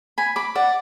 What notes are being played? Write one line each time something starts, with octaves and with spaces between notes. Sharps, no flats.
G#5 B5
B5 D6
D5 F#5